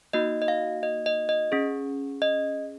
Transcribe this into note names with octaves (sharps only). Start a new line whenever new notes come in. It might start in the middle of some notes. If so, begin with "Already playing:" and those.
A#3 D#4 F#4 D#5
D#5
F5
D#5
D#5
D#5
C#4 G#4
D#5